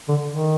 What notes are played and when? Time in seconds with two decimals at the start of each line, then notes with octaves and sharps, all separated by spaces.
0.08 D3
0.29 D#3